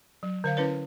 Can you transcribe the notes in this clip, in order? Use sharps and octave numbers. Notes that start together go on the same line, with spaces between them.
F#3
D3 C5 F5
C#4 E4 B4 C#5